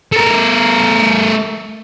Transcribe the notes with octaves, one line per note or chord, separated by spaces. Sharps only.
A3 A#4